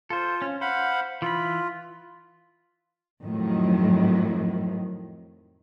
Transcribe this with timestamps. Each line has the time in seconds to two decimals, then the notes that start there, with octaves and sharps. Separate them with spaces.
0.10 F4 A4 C5
0.42 C#4
0.61 C5 F5 F#5 B5
1.22 E3 F4 B5
3.22 F2 A2 D#3 F#3